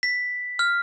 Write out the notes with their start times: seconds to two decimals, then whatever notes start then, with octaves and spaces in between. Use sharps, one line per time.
0.03 B6
0.59 F6